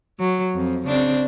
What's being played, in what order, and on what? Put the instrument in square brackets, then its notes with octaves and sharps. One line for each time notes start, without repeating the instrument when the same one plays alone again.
[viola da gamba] F#3
F2
C#3 C4 D4